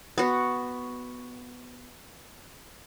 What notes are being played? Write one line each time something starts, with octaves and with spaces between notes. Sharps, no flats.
B3 F#4